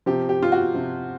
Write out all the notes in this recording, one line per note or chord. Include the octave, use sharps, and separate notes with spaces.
C3 F3 G4
G4
F4
F#4
C3 F3